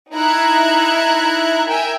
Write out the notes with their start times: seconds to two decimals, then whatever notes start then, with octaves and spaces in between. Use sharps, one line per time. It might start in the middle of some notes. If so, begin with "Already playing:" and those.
0.13 D#4 E4 E5 A#5 F#6 G#6
1.67 A#4 E5 G5 G#5 A#5